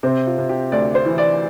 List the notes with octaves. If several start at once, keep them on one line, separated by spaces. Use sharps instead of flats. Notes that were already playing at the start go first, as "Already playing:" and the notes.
C3 C4
F4
C3
G4
D2 D5
C5
E3
D5